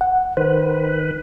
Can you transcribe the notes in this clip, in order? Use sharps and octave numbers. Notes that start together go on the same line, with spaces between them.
F#5
D#3 B4 C5